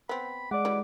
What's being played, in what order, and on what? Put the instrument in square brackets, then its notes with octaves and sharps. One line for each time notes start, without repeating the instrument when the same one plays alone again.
[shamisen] B3 C4 [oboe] B5
[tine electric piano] G#3 [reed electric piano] D5 F#5 [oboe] D6
[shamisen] E3 F#3 G3